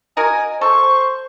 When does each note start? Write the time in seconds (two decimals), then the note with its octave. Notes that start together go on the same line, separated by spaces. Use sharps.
0.17 F#4 A#4 D#5 G#5
0.61 A4 C5 C#6